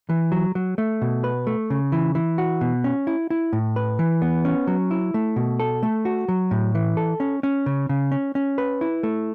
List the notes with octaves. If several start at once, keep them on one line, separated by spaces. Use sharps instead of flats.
E3
F#3
F#3
A3
B2
B4
A3
C#3
E3
E3
F#4
B2
C#4
E4
E4
A2
B4
E3
B3
C#4
F#3
E4
A3
B2
A4
A3
F#4
F#3
A2
E3
A4
C#4
C#4
C#3
C#3
C#4
C#4
B4
E4
A3